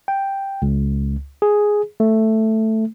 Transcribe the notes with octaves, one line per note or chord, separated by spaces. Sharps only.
G5
C#2
G#4
A3